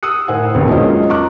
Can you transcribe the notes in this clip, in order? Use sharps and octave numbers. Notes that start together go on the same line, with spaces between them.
D#6 E6 F#6 C#7
A2 A#4 C5 F#5 G#5
E1 A#1 D#2 B4 G5
F3 F#3 G#3 C#4 A#4 D#5
A#5 C#6 D6 F#6